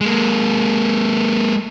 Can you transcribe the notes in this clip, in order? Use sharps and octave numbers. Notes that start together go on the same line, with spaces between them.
G#3 A#3